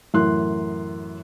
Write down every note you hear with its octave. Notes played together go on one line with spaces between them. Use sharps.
F#2 A2 E3 C6 F#6